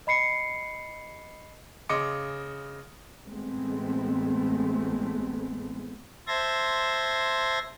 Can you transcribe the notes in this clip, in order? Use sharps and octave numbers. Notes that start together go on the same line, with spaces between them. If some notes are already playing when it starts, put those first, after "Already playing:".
D#5 B5 C7 C#7
C#3 D#5 C6 D6 C#7
A1 G#3 A3 B3 C4
C5 E5 A5 C6 G#6 A#6